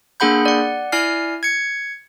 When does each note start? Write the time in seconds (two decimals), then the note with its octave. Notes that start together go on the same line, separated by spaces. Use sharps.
0.20 A#3 D4 G#4 F#5 B5 G6
0.46 D5 F#5
0.92 E4 D5 G#5 F6 C7
1.43 G#6 C#7